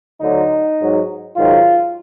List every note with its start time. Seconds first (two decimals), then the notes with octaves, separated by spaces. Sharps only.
0.21 D2 D3 F#3 D#4
0.78 G#2 F#3
1.37 G#2 D#3 F#3 F4